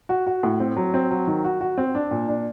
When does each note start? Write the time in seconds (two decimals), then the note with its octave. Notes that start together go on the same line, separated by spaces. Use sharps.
0.09 F#4
0.27 F#4
0.43 A2
0.60 C4
0.76 F#3
0.94 C4
1.11 F#3
1.27 D#3
1.44 F#4
1.61 F#4
1.78 C4
1.95 D4
2.11 A#2
2.28 D4